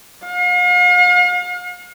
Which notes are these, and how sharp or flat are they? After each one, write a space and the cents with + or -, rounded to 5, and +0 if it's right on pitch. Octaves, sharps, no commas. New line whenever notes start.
F5 +45